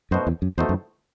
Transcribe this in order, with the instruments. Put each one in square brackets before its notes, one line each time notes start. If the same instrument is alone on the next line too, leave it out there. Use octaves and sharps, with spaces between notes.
[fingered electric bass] F#2 [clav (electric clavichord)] B2 A3 D#4 F#4 C5
[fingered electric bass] E2
F#2
[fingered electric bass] E2 [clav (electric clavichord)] B2 A3 D#4 F#4 C5
[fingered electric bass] F#2